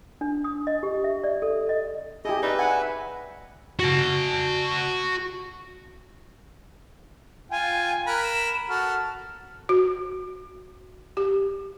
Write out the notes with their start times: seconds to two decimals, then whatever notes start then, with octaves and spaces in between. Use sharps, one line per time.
0.21 D4
0.44 D#6
0.67 D#5
0.83 G4
1.04 E5
1.24 D5
1.42 A4
1.69 D#5
2.25 E4 G4 G#4 D#5
2.43 D#4 B4 D5 E5
2.59 F#5 G#5
3.80 F#4 A5
7.51 F4 G5 G#5
8.07 A#4 B5 F#6
8.23 E7
8.69 F#4 A4 F6
9.69 F#4
11.17 G4